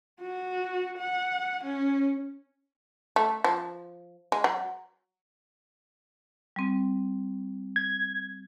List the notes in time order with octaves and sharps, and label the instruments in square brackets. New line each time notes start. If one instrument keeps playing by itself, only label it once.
[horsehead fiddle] F#4
F#5
C#4
[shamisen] A3
F3
G#3
F#3
[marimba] G3 C4
[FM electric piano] G#6